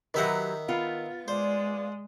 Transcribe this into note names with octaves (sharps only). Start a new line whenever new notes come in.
D#3 F#3 G4 B4 E5 F#5
B3 F4
G#3 C5 D5